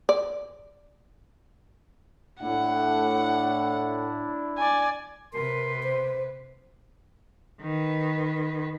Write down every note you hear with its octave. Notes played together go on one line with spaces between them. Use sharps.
D5
A2 D4 E4 F#5
D5 G#5
C3 A#4 B4 C6
C5
D#3 B4